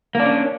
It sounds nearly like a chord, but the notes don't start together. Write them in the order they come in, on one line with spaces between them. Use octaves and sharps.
A#3 D4 C#4